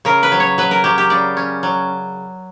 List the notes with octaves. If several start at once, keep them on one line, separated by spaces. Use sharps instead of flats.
C#3 A#4
B4
F#3
C#5
F#3 B4
A#4
F#3 G4
G4
C#3 D5
C#4
F#3